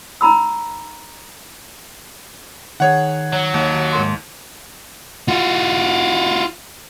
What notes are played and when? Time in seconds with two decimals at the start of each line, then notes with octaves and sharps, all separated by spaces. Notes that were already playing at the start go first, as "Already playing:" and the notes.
0.21 D#4 A#5 B5 E6
2.80 D#3 G#4 C#5 F#5
3.33 F#3
3.54 D#2
3.92 G#2 A#4 C6
5.28 F4 F#4